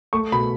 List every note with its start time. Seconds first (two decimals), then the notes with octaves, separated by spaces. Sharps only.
0.13 A3 C#6
0.32 B2 B5